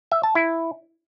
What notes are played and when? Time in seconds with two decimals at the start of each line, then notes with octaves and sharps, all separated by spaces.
0.12 E5
0.23 A5
0.35 E4